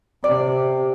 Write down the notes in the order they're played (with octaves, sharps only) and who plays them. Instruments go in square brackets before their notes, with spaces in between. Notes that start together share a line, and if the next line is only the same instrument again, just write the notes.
[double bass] C3 [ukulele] D5